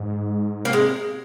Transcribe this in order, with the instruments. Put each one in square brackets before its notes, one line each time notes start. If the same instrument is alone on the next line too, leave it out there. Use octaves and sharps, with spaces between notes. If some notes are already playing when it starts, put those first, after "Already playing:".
Already playing: [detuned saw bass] G#2
[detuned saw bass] C3 [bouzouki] A#3
[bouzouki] G#3